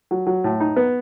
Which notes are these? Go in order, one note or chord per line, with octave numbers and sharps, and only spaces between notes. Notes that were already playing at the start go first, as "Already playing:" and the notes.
F#3
F#3
A2
D#4
B3